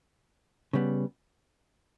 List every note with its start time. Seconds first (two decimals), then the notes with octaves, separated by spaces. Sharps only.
0.73 C#3 G3 B3